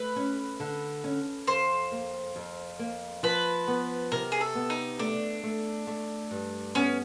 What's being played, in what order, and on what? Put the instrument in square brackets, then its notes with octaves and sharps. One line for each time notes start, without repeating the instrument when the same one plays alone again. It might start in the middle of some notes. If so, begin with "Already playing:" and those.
Already playing: [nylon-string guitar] A3 [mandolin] B4
[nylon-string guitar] C#4
D3
C#4
[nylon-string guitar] F2 [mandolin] C5
[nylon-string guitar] A#3
F2
A#3
[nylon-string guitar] F3 [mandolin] B4
[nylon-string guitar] B3
[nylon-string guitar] C3 [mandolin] A#4
[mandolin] G#4
A4
[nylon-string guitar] B3
[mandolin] D#4
[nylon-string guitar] A3 [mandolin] D4
[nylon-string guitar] A3
A3
G2
[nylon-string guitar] B3 [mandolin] C#4